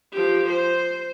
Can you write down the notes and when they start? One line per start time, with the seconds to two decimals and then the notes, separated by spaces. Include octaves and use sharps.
0.13 F3 G4
0.49 C5